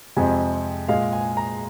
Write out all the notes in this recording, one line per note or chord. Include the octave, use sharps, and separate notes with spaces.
F2 C3 G#3 G#5
A#2 G#3 F5
G#5
A#5